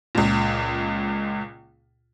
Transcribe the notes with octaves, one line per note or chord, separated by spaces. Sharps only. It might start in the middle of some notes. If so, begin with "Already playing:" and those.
C#2 A#2